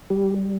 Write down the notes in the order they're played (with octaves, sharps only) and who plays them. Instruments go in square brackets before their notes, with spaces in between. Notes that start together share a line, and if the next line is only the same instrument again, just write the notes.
[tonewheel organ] G3 G4